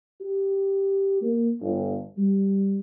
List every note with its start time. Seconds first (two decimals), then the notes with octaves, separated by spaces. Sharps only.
0.21 G4
1.22 A#3
1.60 G1
2.17 G3